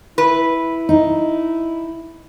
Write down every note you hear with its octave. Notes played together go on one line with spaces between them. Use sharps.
E4 B4
D#4